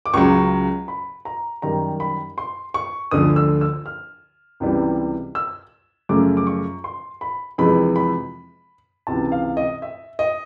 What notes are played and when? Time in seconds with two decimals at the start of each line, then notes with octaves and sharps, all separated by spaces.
0.06 D6
0.13 C#2 C#3 F#3 C#6
0.88 B5
1.25 A#5
1.62 F#2 D#3 G3 A#5
2.00 B5
2.38 C6
2.74 C#6
3.11 D2 D3 F3 D#6
3.36 E6
3.61 E6
3.86 F6
4.60 C#2 C3 E3 G3
5.35 E6
6.09 F#2 C#3 F3 A3 D6
6.37 D6
6.47 C#6
6.84 C6
7.21 B5
7.58 F2 C3 E3 G#3 B5
7.96 B5
9.07 C#2 C3 E3 A5
9.32 F5
9.57 D#5
9.82 E5
10.19 D#5